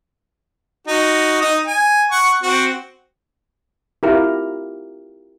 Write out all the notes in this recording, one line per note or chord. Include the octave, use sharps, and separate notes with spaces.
D#4 F#4
D#4 D#6
G#5
F#5 C#6
C4 F#4
E4 F4 G4 A#4